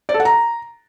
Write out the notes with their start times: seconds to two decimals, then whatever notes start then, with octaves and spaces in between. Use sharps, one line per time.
0.09 D5
0.14 A4
0.20 F#5
0.25 A#5